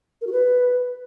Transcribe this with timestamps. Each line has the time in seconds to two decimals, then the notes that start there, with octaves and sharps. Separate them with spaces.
0.21 A#4
0.27 F#4
0.32 B4